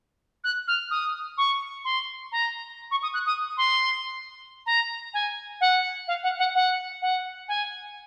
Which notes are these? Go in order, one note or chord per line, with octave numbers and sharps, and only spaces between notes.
F#6
F6
D#6
C#6
C6
A#5
C#6
D#6
F#6
D#6
C6
A#5
G#5
F#5
F5
F#5
F#5
F#5
F#5
G#5